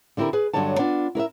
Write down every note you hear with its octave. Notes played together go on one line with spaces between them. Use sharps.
D3 C4 E4 G4 A#4
G#4 B4
G2 D3 F#3 G3 C#5 A5
B3 D4 F4
E4 A#4 D5 E5